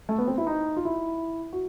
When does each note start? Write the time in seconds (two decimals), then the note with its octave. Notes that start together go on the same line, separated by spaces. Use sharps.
0.09 A3
0.18 B3
0.28 C4
0.38 E4
0.47 D#4
0.76 F4
0.85 E4
1.53 F#4